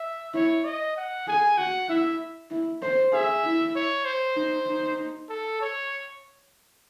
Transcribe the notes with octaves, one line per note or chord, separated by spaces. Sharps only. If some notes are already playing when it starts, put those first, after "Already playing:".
Already playing: E5
E4 C#5
D#5
F#5
G#4 G#5
F#4 F#5
E4 E5
E4
C5
G#4 E5
E4
C#5
C5
D#4
D#4
A4
C#5